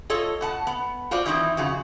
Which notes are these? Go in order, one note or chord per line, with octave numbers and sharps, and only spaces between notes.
F4 A4 C#5 D#5
B2 F#5 A5
B3
F4 F#4 C5 D5
D#3 E3 C4 D#4 E4
F2 C#3 F#4